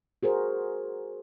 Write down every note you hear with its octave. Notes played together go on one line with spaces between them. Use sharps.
F#4 G#4 A#4 C5